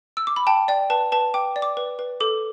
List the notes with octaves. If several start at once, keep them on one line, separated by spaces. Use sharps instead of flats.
E6
D6
B5
G5 A5
D5 G5
B4 A5
B4 A5
G5 D6
D5
D6
B4
B4
A4 D6